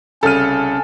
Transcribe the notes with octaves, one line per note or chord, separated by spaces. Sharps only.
C2 C#3 C#4 A4 F6 D#7